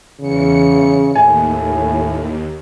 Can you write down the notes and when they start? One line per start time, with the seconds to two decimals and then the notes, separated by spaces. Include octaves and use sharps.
0.20 E2 C#3 C#7
1.15 D#2 A2 G#5